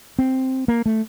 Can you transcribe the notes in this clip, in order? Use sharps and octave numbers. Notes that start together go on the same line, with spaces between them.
C4
A#3
A3